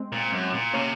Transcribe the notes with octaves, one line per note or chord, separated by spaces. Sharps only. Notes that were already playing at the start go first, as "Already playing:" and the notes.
Already playing: G#3 C4
A#2
F#2
A#2
C3 A#3 C#4